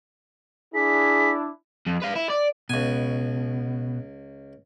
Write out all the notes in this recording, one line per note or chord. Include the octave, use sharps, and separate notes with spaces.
D4 E4 G#4 B6
F2
B4 F5
E4
D5
C#2 B2 G#5